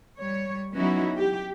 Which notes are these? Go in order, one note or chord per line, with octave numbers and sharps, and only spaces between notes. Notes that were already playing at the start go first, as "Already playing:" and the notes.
G3 C#5
F#3 B3 C#4 D#4 E4 F#4
G4